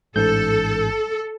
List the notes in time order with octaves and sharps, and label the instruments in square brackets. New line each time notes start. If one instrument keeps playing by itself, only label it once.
[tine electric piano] A1 G#2 G6 [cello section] A4